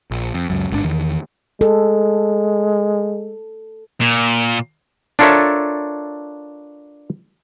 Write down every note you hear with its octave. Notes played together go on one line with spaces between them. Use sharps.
A#1
F2
C#2 F#2
G1 G#2 C#3 D4
E2 D#3
G#3 A4
A#2
D4 F4 A4 A#4 C#5 E5